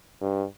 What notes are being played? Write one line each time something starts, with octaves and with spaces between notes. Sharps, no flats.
G2